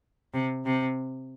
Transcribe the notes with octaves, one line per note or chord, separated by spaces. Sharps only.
C3
C3